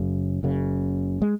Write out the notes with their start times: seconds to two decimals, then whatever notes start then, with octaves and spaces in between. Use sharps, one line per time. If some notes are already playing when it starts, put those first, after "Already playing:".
Already playing: F#1 F#2 C#3
0.43 F#1 F#2 C#3
1.22 G#3